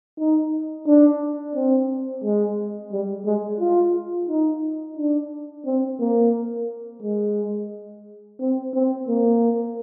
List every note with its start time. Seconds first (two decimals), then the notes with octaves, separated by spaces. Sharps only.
0.18 D#4
0.87 D4
1.55 C4
2.24 G#3
2.92 G3
3.25 G#3
3.60 F4
4.28 D#4
4.97 D4
5.66 C4
6.00 A#3
7.02 G#3
8.40 C4
8.74 C4
9.08 A#3